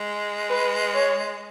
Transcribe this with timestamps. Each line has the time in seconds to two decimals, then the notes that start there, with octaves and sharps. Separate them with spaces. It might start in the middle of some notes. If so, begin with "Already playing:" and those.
Already playing: G#3
0.50 B4
0.94 C#5